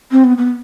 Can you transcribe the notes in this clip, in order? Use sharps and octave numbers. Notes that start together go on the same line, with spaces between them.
C4
B3
B3